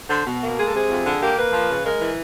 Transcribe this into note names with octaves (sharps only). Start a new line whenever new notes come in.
D3 C5
B2
A#3
G#3 G#4
A4
C3 G#4
F2
D3
A#3 G4
A#3 B4
F3
C#3
G#3 A#4
E3